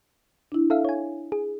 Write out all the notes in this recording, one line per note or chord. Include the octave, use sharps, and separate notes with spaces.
D4 E4
A4 E5 F5
C#5 G#5
G#4